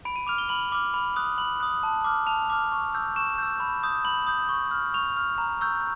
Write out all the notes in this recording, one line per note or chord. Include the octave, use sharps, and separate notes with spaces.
B5 D7
D#7
D6 F6 F7
G7
B5 F#7
D6 F6
B5
D#6 F#6
B5 F#7
D#6 F#6
A5
D6 F6
A5 F7
D6 F6
C#6
E6 G6
C#6 E7
E6 G6
B5
D#6 G6
B5 F#7
D#6 G6
C#6
F6
C#6 F7
F6
A#5
C#6 E6 G6